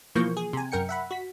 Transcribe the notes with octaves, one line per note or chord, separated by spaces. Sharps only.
B2 E3 F3 A#3 C#6 G6
G#4
C3 G#5
F#2 A#4 G5 C#7
E5 F#5 B5
F#4 B6